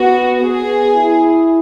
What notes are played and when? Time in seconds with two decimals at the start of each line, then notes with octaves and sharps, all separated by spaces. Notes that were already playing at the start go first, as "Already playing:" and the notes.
Already playing: B3 F#4
0.42 B3 G#4
0.95 E4